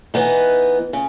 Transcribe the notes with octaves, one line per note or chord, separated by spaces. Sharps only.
E3 B3 D#4
C#3